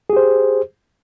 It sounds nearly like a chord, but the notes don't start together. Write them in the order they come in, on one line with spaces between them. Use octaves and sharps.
G#4 G4 C5